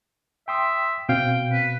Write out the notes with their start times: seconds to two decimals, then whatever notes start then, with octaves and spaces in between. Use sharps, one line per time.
0.48 E5 G5 C6 D#6
1.09 B2 C4 F5 G5
1.53 B4